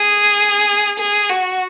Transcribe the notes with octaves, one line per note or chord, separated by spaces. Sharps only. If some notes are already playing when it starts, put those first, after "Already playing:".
Already playing: G#4
G#4
F#4